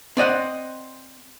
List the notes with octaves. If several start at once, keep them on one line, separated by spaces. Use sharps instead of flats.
C4 D5 D#5 F#5